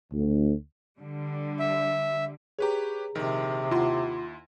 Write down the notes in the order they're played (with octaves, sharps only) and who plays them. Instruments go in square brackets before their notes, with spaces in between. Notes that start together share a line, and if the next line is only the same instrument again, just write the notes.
[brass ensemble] D2
[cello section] D3 G3
[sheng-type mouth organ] E5
[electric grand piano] G4 B4 C#5 [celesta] G#4 A#5
[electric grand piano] A#1 D#3 [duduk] C3
[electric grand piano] D#2 E4 C6 [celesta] F4 F#5